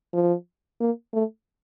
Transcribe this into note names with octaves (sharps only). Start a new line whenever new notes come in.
F3
A#3
A3